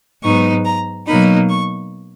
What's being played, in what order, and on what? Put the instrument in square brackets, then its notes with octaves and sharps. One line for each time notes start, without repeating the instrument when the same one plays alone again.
[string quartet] G#2 F#3 B3 D#4 C#6
A#5
B2 F#3 A#3 D#4 B5
C#6